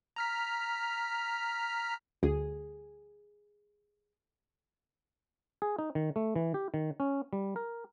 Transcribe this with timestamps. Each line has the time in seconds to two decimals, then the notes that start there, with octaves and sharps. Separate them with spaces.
0.16 A#5 F6 B6
2.23 D2 G#4
5.62 G#4
5.79 D#4
5.95 D#3
6.16 A3
6.36 E3
6.54 G4
6.74 D#3
7.00 C#4
7.33 G3
7.56 A#4